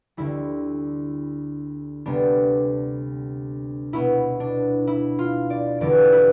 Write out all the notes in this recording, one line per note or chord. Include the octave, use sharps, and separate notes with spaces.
D2 D3 G3 E4
D2 C3 G3 B3 D4
B2 B3 E4
D4
E4
F4
D5
E2 D3 G3 B3 D5
E4